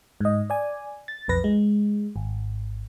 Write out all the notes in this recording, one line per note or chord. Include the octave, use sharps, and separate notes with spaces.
G#2 D#5
D5 G#5
A6
B1 F2 B4 A#6
G#3
G#1